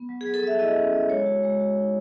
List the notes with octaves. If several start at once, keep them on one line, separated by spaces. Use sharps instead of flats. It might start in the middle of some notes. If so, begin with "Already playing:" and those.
Already playing: B3
F#3
G#4
F#3
A4
F#3 E5
E4 D#5
C#4
F#3
G#3 C#5
F#4
G#3
F#4
D#4